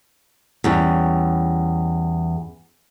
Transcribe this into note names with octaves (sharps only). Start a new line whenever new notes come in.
E2 G3 C#4